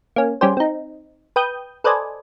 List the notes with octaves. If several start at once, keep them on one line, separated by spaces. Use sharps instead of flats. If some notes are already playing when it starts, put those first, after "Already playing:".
A#3 C#4
G3 C#4 G4 G#4 C5
C4 D#4
B4 G5 D#6 G6
A4 B4 C5 D5 D#5 G#5